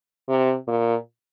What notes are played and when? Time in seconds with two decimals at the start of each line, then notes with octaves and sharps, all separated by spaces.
0.28 C3
0.68 A#2